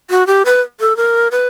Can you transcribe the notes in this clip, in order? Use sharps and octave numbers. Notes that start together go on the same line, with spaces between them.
F#4
G4
B4
A4
A#4
B4